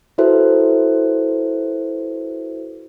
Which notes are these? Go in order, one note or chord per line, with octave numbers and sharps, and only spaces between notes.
E4 F#4 A4 B4 C5 E5